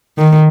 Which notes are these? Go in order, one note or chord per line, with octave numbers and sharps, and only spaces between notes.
D#3